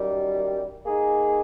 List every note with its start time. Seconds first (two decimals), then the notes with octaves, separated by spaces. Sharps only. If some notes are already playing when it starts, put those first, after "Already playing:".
Already playing: F#2 D#3 G3
0.85 A#3 D#4 G#4